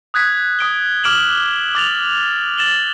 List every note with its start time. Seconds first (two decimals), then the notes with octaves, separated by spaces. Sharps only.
0.14 D#6 F#6 G#6 B6
0.59 D#6 D7 G7
1.03 D6 F6 D7 E7 F#7 G7
1.75 D6 A6 F7
2.57 A6 E7 F#7 G7